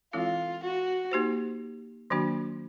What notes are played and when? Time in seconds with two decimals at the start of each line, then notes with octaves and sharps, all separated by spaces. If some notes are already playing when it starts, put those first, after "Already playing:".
0.13 E3 G#3 C4 E4 F4 A4
0.63 F#4
1.11 A#3 D#4 G4 C5
2.10 D#3 F#3 A#3 D4 F#4